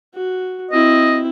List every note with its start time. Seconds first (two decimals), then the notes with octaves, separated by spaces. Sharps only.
0.14 F#4
0.71 C4 E4 D#5